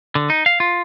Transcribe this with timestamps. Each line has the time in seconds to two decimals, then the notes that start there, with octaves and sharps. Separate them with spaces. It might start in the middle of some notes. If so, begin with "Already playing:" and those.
0.15 D3
0.30 D#4
0.46 F5
0.60 F4